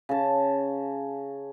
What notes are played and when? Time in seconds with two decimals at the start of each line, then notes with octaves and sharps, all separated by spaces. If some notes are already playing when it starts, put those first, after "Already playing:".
0.09 C#3 A5